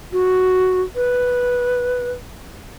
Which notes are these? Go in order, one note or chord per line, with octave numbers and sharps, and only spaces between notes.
F#4
B4